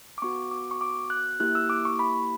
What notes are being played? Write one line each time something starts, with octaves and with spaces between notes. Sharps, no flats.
D6
B3 F#4 C#6
D6
C#6
D6
F#6
A#3 E4 G4 F#6
E6
D6
C#6
B5